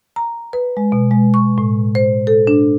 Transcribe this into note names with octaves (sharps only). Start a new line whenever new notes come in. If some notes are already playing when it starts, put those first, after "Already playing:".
A#5
B4
G#3
B2
G#3
C#6
A2
C5
A4
D4